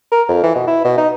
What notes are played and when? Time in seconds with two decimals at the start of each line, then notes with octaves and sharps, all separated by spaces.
0.12 A#4
0.28 F2
0.43 E3
0.56 B2
0.67 E4
0.85 B2
0.98 D#4